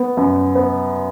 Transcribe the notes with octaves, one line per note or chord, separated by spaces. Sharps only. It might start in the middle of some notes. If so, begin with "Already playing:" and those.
Already playing: B3
F#2
B3